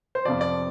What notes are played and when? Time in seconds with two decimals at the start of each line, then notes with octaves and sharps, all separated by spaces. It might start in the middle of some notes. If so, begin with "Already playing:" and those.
0.15 C5
0.25 F2 C3 F3 D5
0.41 D5